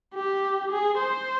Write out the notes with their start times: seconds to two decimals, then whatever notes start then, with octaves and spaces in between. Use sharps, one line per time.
0.15 G4
0.71 G#4
0.99 C5